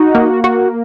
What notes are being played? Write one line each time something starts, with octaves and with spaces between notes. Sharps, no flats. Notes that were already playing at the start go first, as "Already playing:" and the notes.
Already playing: D#4 F#4
A#3
F#4